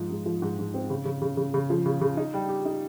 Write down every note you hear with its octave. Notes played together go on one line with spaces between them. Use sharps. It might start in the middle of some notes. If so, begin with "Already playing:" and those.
Already playing: G#2 F3 D#4
G#2
F3
G#2
G#2
C4
C#3
C#3
C#3
C#3
C#3
F3
C#3
C#3
D#4
G3
G4
D#4